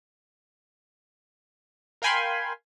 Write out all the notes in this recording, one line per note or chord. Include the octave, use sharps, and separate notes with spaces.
A#4 F5 G5 G#5 B5 C6